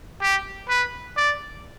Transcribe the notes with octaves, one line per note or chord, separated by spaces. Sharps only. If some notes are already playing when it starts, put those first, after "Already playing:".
G4
B4
D5